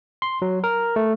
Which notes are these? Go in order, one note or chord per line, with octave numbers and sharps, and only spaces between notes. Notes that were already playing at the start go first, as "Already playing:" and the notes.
C6
F#3
A#4
A3